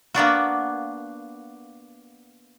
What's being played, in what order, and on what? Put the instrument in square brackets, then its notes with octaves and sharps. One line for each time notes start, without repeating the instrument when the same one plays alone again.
[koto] A#3 B3 D4 F#4